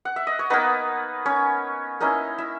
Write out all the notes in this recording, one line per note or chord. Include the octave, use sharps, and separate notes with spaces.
F#5
E5
D#5
C#5
A#3 B3 D#4 B4
C#4 C#5
A#3 C#4 D#4 E4 D#5
E4 E5